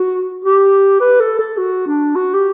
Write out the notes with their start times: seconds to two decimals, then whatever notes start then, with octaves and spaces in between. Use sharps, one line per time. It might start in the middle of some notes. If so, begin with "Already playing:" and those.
Already playing: F#4
0.45 G4
1.01 B4
1.20 A4
1.39 A4
1.58 F#4
1.87 D4
2.16 F#4
2.34 G4